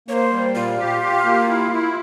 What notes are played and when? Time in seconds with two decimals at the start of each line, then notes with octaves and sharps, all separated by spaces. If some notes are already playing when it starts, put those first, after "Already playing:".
0.08 A#3 C#5
0.13 C5
0.32 G3
0.55 A#2 F4
0.79 G4
1.02 G4
1.25 A#3
1.48 E4
1.72 E4